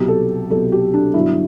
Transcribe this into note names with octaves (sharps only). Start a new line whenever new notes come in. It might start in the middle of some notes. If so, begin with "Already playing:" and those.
Already playing: C2 B2 F#3 G4
A4
C2 B2 F#3 A4
G4
D4
G1 G2 D3 F#3 E4